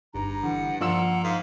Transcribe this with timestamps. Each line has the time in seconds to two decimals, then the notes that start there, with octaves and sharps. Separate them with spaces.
0.14 G1 G2 A#5
0.43 D3 E3 F#5
0.81 G2 F3 A#3 D4 F4 F#5 E6
1.24 G#2 F5